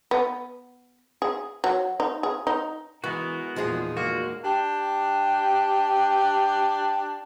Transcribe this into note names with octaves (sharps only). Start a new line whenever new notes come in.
B3
G#4
F#3
D#4
G#4
D#4
E3 G#3 B3 F#4 A#4
E2 A#2 F3 D#4 F4 G#4
G#3 A#3 F#4
D4 G4